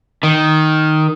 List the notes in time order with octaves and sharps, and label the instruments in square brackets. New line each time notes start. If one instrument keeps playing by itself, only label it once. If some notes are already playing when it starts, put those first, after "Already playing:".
[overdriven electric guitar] D#3